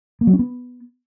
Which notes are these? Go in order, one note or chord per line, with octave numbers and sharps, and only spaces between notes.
A#3
F#3
C#4
B3